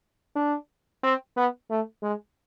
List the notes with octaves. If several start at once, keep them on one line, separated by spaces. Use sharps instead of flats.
D4
C4
B3
A3
G#3